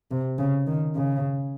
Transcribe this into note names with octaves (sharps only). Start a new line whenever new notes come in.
C3
C#3
D#3
C#3